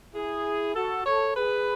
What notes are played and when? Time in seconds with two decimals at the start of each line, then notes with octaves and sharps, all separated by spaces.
0.13 E4 G#4
0.74 F#4 A4
1.04 A4 C#5
1.35 G#4 B4